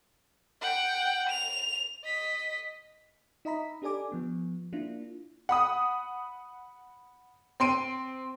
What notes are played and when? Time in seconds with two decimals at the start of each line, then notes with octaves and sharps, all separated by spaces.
0.61 F#5 G5
1.28 F7
2.04 D#5 B6
3.45 D#4 D#5 E5 A#5 B5 B6
3.82 D4 G4 A4 D5 G#5 D6
4.12 F3 B3
4.73 A#3 D4 E4 F4
5.49 F#5 B5 D#6
7.60 C4 C6 D7 D#7